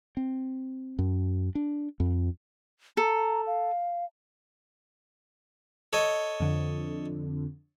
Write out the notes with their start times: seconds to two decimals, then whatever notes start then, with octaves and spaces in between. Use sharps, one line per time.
0.17 C4
0.99 F#2
1.55 D4
2.00 F2
2.97 A4 A#5
3.47 F5
5.93 A4 C#5 D#5
6.40 F2 D3